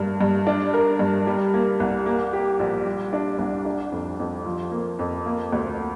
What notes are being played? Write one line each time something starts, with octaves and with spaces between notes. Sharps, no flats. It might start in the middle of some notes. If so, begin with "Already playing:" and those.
Already playing: G2 A#3
G2
D4
A#4
G2
G3
A#3
C2
A#3
G4
A#1
G3
D4
C2
D4
F2
F2
F3
A#3
F2
A#3
D2